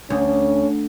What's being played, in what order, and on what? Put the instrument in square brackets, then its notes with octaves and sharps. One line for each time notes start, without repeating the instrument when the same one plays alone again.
[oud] D2 [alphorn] C#4